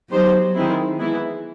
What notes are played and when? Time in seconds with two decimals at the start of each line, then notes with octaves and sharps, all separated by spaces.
0.11 F#3 B3 D#4 G4 C5
0.55 D#3 G#3 C4 E4
0.99 E3 G#3 B3 E4